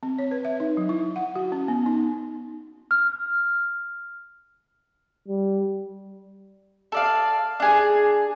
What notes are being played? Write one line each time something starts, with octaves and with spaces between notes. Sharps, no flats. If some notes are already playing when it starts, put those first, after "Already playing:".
C4
C#5
B4
E5
D#4
F#3
E4
F#5
F#4
C#4
B3
D#4
F6
G3
A4 D5 F5
D4 G#4